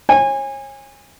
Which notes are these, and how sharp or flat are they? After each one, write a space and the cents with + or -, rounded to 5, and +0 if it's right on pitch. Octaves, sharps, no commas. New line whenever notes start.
C#5 -35 G#5 -25